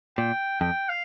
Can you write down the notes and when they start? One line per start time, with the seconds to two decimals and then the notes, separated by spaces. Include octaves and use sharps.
0.17 A#2 G5
0.60 F2 G5
0.89 F5